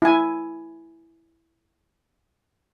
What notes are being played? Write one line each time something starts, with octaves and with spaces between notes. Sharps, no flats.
E4 G#5